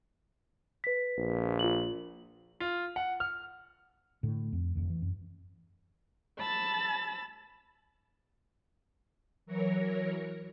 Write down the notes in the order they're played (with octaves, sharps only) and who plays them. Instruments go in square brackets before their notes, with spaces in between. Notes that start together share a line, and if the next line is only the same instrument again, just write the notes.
[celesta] B4 B6
[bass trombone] A#1
[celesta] F4 F#7
[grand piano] F4
F#5
F6
[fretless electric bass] A2 D3
F2
F1 A#1 F2 D#3
E3
F#2
[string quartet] A5 B5 E6 A6
[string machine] E3 F#3 A#4 C#5 A#6 C#7